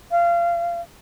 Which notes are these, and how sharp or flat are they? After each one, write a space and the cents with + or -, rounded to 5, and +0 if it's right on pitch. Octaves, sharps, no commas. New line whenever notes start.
F5 -25